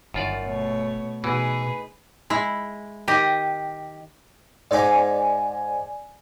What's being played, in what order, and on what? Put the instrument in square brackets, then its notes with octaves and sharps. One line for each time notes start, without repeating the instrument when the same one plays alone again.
[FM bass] G1 [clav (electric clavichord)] F#2 F4 D5 [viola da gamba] D#3 D#4
[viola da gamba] B2 A3 C#5
[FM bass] B2 [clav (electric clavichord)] E3 [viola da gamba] D#4 G#4 B4
[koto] G#3 E4
D#3 G4 D#5
[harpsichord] G#2 D#4 D6 [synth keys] D5 G#5